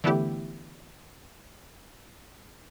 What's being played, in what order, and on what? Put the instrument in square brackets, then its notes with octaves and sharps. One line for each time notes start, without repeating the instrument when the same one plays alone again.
[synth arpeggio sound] D3 E3 A3 B3 E4 G4